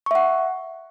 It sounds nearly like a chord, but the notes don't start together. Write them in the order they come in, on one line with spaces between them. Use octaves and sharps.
C#6 E5 F#5